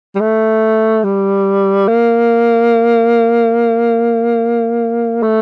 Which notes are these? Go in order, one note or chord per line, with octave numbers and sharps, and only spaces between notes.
G3
A3
G3
A#3
A3